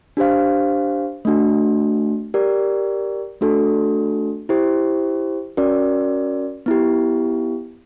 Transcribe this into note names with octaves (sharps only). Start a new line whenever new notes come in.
D4 G4 C5 F5
A3 D4 F#4
G4 A#4 D5
A3 D4 F#4 A4
E4 G4 C5
C#4 F#4 A#4 D5
B3 E4 G4